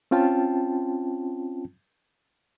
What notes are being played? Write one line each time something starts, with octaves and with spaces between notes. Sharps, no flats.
C4 C#4 F4 G5 A5